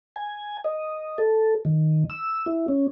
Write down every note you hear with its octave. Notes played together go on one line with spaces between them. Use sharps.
G#5
D#5
A4
D#3
E6
E4
C#4